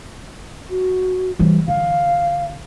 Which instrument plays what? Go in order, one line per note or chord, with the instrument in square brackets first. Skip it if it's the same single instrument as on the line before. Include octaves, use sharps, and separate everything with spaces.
[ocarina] F#4
[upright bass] E3 G3
[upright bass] D3 [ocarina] F5